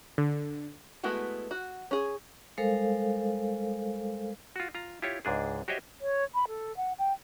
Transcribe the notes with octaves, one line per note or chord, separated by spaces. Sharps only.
D3
G#3 A3 B3 E4 F#4
F#4
C#4 G#4
G3 G#3 A4 A#4 C5 F5
F4 F#4
F4 A#5
E4 F4 G4 C#5
C#2 G#2 D4 G#4
F#4 G4 C5 C#5 D#5 E5
C#5
B5
A4
F#5
G5